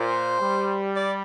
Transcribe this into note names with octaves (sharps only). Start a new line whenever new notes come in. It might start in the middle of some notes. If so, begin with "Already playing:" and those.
Already playing: A#2 C5
G3
D5